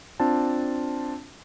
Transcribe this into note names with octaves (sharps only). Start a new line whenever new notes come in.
C4 D4 F4 A5